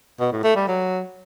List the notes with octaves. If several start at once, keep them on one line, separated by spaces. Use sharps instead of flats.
B2
A2
A3
G3
F#3